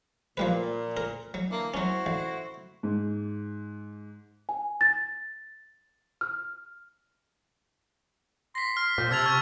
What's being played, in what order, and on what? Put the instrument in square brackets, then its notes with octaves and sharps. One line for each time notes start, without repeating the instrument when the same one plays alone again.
[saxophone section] A#2 [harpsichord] F3 G3 B4
[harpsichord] A#4
F#3
[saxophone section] D3 E3 A#3
[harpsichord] F#3 C#4 [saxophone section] E4 F#4 C5
[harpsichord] A1
[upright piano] G#2
[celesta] G#5
A6
F6
[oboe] C6 [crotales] A#6 B6
[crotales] F6
[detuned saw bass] A#2 [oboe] C5
[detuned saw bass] C3 [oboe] A5 [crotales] E6 G#6 F7
[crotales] C#6 F6 G#6